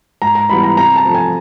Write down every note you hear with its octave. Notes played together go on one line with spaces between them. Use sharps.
G#2 A#5
A#5
E3 G3 B3 B5
A#5
C3 A#5
A5
F3 A3
G#5